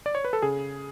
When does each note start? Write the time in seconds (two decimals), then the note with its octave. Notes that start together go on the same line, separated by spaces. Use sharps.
0.06 D5
0.15 C#5
0.25 B4
0.33 A4
0.42 C#3 G#4